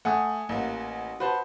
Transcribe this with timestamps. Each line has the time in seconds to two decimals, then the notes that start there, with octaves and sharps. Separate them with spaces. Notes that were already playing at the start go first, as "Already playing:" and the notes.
0.05 A3 F#5 G#5 D#6
0.49 A1 A#3
1.20 F#4 B4 C5 A5